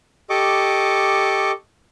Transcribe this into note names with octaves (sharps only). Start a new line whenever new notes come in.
G4 A4 D#5 C#6 D6